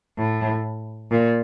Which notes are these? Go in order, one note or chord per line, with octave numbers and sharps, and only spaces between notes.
A2
A#2